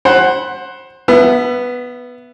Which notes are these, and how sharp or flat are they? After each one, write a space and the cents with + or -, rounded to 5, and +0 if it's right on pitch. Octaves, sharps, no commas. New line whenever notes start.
C5 +20 F#5 +10 B5 -5
B3 +0 E5 +30